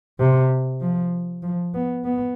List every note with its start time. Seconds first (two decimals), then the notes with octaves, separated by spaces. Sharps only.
0.19 C3
0.81 F3
1.43 F3
1.74 B3
2.05 B3